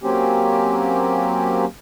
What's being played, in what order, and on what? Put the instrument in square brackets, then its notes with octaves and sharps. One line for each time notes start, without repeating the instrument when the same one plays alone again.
[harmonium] F#3 A#3 C4 C#4 G4